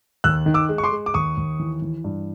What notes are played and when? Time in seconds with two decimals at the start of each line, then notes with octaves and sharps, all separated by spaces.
0.24 D#2 E6 F#6
0.46 D#3
0.54 D6 E6
0.69 G#3
0.78 C#6
0.84 C6 D6
0.92 G#3
1.06 D6
1.14 D#2 C#6 D#6
1.37 D#2
1.60 E3
1.82 E3
2.04 G2